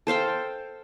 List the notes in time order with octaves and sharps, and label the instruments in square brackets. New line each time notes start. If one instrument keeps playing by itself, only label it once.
[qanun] A4 C5 F5 G5